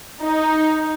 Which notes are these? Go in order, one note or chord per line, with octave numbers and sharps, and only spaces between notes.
D#4